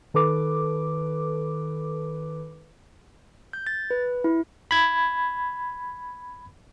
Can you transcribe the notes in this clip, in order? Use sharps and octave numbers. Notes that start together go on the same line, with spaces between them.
D#3 A4 B4 D6
G6
A6
B4
E4
B5 G#6